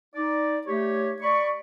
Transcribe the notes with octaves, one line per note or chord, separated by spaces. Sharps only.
D#4 D5
A3 G4 C#5
D5 B5 C#6